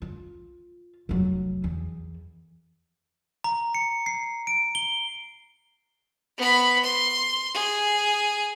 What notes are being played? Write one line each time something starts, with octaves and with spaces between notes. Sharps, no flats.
F4
F1 F#3
E2
A#5
C#7
C7
D7
G7
B3 B5
C6
G#4